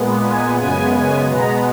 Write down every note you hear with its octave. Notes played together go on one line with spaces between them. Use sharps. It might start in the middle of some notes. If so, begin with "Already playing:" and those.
Already playing: A#2 G#3 B3
G#5
F#2 C#3 G#3 B3 G#5
G#5
B2 G#3 B3 A#5